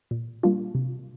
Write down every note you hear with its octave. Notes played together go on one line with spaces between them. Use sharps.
A#2
G3 A#3 D4 F4
C3